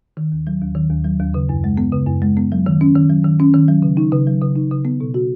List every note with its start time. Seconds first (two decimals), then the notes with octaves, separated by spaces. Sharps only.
0.17 D#3
0.32 D#2
0.47 F#3
0.61 D#2
0.75 D#3
0.90 D#2
1.05 F#3
1.20 D#2
1.34 C#3
1.49 F#2
1.64 G#3
1.77 B3
1.92 C#3
2.07 F#2
2.22 G#3
2.37 B3
2.52 F#3
2.66 D#3
2.81 C#4
2.95 D#3
3.10 F#3
3.25 D#3
3.40 C#4
3.54 D#3
3.68 F#3
3.83 C#3
3.97 D#4
4.12 C#3
4.27 F#3
4.42 C#3
4.56 D#4
4.71 C#3
4.85 B3
5.01 B2
5.14 F#4